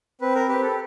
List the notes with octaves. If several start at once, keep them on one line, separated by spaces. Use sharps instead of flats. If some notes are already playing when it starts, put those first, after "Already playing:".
C4 B4
A#4
G4 B4
A4